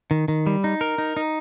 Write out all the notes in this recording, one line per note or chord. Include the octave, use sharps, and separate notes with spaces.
D#3
D#3
G3
D#4
A#4
D#4
D#4